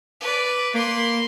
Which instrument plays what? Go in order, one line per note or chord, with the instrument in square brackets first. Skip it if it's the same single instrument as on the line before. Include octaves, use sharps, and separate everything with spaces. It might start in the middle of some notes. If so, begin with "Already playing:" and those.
[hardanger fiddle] B4 D5
[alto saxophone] A#3 [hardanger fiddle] B5 C6